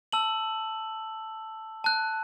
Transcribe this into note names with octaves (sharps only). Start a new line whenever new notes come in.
A5 E6 F#7
A5 F#6